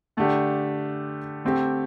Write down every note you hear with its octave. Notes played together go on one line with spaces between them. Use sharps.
D3 A3 D4 G4
D3 A3 C4 G4